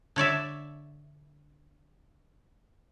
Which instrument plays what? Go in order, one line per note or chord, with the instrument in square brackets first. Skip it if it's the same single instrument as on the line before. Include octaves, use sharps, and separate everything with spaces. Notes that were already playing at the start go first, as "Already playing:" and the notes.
[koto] D3 C#5 D5 E5